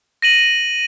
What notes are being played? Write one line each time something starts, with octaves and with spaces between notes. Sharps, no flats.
A#6 D#7 F#7